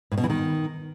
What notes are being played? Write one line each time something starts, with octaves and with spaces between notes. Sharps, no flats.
A2
B2
E3
D#3